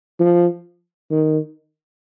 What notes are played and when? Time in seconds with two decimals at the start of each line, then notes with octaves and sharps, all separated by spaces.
0.20 F3
1.11 D#3